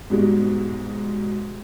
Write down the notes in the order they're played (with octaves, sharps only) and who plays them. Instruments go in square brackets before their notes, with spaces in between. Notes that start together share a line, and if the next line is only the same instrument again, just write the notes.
[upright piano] G#2 B2 G3 G#3